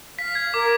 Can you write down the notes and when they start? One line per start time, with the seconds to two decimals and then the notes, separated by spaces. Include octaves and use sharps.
0.18 F5 B6
0.35 G#6
0.53 A#4 D6